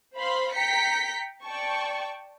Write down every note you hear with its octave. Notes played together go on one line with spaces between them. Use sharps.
C5 F5 B5 C6
G5 A#5 G6 B6 C#7
D5 G5 A5 C#6